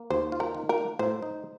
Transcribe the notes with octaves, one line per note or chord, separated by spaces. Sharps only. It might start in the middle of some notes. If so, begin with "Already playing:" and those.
Already playing: A#3
D#2 C5
F4
A#4
D#3
A#4
A#3
A2 C5
D#4